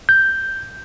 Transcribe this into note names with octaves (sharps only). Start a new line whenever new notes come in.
G6